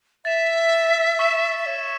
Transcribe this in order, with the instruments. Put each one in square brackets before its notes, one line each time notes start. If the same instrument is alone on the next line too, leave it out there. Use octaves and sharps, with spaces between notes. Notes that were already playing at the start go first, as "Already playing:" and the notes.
[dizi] E5 [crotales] A6 E7
[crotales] C#6 E6 B6 E7
[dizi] E5
C#5